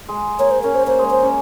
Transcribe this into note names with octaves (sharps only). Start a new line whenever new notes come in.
G#3
A#3 C#5
C5
C#4 A#4
C5
A#3 C5
G#3
C5
C#4